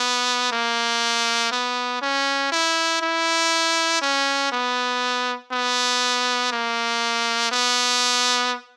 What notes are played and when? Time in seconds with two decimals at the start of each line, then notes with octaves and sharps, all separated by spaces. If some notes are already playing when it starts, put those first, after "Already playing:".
Already playing: B3
0.52 A#3
1.52 B3
2.02 C#4
2.52 E4
3.02 E4
4.02 C#4
4.52 B3
5.52 B3
6.52 A#3
7.52 B3